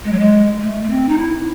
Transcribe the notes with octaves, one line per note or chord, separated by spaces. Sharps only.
G#3
F#3
G#3
A3
A3
C4
D#4
E4